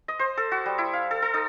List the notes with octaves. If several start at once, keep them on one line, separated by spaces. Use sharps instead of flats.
D#5
C5
A4
F#4
G3
E4
F5
A4
A4
D#4